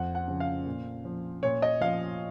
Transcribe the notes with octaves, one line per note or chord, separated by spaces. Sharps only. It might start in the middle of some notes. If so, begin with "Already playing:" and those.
Already playing: F2 F#5
F#5
C#3 F3
F5
A#2
F3
A#2 C#5
D#5
F3 F5